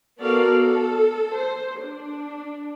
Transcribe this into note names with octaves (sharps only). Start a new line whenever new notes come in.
B3 F#4 A4 A#4 D5 F5
A4
C5
D4